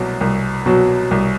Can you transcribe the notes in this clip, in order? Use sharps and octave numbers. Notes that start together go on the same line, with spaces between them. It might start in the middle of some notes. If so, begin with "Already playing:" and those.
Already playing: C2 B2 F#3
C2
B2 F#3
C2